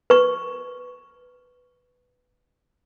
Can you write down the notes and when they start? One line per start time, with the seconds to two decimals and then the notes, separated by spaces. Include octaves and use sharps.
0.10 B4 C#6